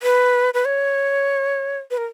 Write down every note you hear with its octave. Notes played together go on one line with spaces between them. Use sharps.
B4
B4
C#5
B4
A#4